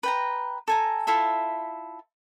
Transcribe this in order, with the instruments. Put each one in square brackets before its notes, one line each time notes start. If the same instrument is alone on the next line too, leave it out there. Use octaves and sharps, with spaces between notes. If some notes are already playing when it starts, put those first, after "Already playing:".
[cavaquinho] B4 G5 A#5
A4 G#5 A#5
E4 F4 A4 E5